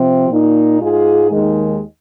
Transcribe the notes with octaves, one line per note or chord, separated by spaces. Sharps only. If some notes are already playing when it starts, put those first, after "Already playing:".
Already playing: C3 F3 C4
A#2 A#3 D#4
G#2 G#3 F4 G#4
D#2 D#3 G#3